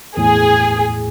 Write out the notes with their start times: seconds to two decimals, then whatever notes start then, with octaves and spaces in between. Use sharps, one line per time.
0.17 E2 A2 G#4